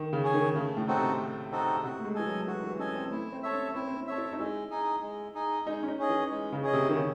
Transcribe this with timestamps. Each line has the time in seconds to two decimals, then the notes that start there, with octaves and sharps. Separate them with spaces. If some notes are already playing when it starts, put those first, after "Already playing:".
Already playing: D#3
0.13 C#3
0.23 C#4 G#4 C#5 G#5
0.34 D#3
0.55 C#3 A3
0.77 A2
0.87 C4 D#4 F#4 A4
0.98 C3
1.19 A3
1.51 C4 D#4 F#4 A4
1.83 C3 F#4
2.00 A3
2.05 G#3
2.15 E3 A4 D#5 G#5
2.26 F#3
2.47 E3 F#4
2.63 E3
2.79 C#4 A4 D#5 G#5
2.95 C4
3.11 A3 E4
3.32 C4
3.43 A4 C#5 E5
3.53 C#4
3.75 C4 E4
3.87 C4
3.96 C#4
4.07 A4 C#5 E5
4.17 E4
4.32 D#4
4.39 G#3 E4
4.70 D#4 G#4
5.03 G#3
5.35 D#4 G#4
5.66 G#3 D#4
5.83 C#4
5.88 D#4
5.99 C#4 G#4 D#5
6.09 E3
6.31 G#3
6.52 C#3
6.62 C#4 G#4 D#5
6.73 C3
6.89 D#3
6.94 C#3 C#4